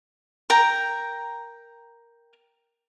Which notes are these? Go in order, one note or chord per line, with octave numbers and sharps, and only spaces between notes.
A#4 G5 A#5